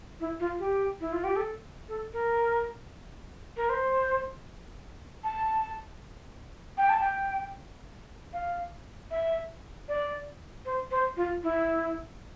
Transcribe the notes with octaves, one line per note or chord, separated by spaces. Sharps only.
E4
F4
G4
E4
F4
G4
A4
A4
A#4
A#4
C5
A5
G5
A5
G5
F5
E5
D5
C5
C5
F4
E4